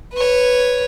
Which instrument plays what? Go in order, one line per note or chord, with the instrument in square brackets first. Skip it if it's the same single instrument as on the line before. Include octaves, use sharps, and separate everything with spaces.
[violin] B4 C#5